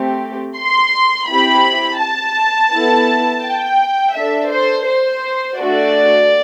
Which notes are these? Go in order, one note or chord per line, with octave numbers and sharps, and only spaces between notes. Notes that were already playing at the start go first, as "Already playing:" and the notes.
Already playing: A3 C4 G4
C6
C4 E4 G4 B5
A5
B3 E4 A4
G5
D4 A4 E5
C5
C5
A3 D4 F#4 A4 D5